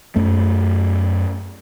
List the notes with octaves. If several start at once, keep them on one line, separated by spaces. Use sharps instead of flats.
F#2 A3